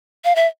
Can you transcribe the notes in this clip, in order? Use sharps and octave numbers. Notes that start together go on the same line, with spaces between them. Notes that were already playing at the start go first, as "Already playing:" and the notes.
F5
E5